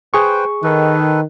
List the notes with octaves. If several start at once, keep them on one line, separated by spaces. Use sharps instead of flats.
G#4 B4 C5 G5 C#6
D#3 A4 B4